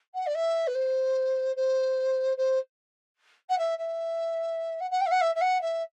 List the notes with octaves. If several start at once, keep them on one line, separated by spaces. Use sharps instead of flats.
F#5
D5
E5
B4
C5
C5
C5
F#5
E5
E5
F#5
F#5
G5
E5
F#5
E5
E5
F#5
E5